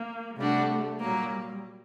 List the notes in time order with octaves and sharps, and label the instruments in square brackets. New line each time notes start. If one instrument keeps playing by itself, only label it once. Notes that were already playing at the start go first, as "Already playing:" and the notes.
Already playing: [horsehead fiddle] A#3
[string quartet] C3 G3 D4 F#4 [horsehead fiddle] A3
[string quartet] A#2 F#3 A#3 [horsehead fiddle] G3